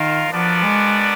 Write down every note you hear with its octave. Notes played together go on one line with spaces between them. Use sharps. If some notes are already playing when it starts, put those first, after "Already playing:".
Already playing: D#3 F4 A#4 F5
F3 B3 D4 F#4 A#4 D5
G#3